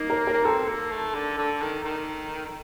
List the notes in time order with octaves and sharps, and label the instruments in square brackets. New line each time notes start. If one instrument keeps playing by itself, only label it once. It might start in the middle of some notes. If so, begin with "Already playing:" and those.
Already playing: [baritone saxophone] A#3 [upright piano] D#4
[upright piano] A#4
A#4
[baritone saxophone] A#3
[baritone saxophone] C4 [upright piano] A4
[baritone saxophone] A#3
A3
D3
D3
D#3
D#3